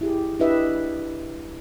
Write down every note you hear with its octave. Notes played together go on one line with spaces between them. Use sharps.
E4 G4 G#4
D4 E4 G4 B4 D#5 E5